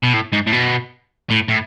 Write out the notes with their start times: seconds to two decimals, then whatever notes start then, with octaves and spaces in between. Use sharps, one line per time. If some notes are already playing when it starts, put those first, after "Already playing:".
0.04 B2
0.14 A2
0.33 G#2
0.47 A2
0.53 B2
1.30 A2
1.48 A2